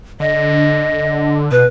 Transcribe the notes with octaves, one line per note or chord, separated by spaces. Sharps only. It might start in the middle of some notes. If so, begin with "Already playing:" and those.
D3 D#5
B2 B4